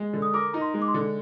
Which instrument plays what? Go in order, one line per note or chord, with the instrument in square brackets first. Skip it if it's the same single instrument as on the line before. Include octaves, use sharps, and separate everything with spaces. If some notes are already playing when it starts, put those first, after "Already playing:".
Already playing: [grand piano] G#3
D3
[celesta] D#6
[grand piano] A#4 [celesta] D6
[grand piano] D#4 [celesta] A#5
[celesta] C6
[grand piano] G#3
[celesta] D6
C6
[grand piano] D3